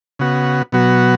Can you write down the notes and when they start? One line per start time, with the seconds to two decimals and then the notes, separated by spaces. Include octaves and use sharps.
0.19 C#3 B3 F#4
0.72 B2 F#3 B3 F#4